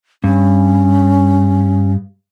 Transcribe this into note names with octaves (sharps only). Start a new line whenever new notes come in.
G2 C#4